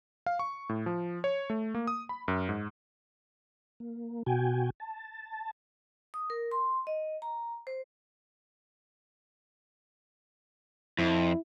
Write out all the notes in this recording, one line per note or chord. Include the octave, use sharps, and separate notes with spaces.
F5
C#6
A2
F3
C#5
A3
A#3
D#6
B5
F#2
G#2
A#3
B2 F#4 G5 G#5
A5
D#6
A#4
C6
D#5
A#5
C5
F2 E4